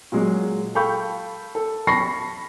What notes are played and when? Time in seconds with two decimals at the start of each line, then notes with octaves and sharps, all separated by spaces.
0.12 A#2 F#3 G#3
0.75 A4 F5 G5 B5 C#6 G6
1.55 A4
1.87 A5 B5 C#6 A#6 C7